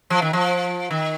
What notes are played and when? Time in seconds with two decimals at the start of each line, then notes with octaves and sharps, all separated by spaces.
0.10 F3
0.22 D#3
0.33 F3
0.91 D#3